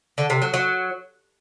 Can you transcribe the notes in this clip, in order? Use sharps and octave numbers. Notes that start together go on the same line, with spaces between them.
D3
C3
F#3
F#3